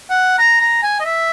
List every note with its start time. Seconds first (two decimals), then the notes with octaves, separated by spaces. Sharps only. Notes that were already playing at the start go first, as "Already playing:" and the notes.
0.10 F#5
0.39 A#5
0.61 A#5
0.83 G#5
1.00 D#5
1.05 E5